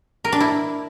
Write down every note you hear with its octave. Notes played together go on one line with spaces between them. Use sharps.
A#4
D4
E4